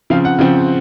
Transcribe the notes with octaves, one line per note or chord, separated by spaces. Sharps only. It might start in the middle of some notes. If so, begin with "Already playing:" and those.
C#3 F3 C4 F5
F#5
C#3 F3 C4